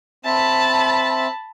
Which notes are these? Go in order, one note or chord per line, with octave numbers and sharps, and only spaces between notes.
C4 E5 A5 B5